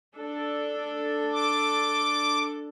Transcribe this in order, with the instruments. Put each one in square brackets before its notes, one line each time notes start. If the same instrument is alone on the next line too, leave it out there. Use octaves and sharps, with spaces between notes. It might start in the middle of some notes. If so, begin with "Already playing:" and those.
[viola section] D4 A4
[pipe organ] D6